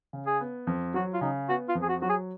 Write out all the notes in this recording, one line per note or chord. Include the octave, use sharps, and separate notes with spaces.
C#3
G#4
B3
F2
F#3 F#4
F4
C#3 D#4
B3 F#4
F4
F2
G#4
F#4
F#3 F#4
G#4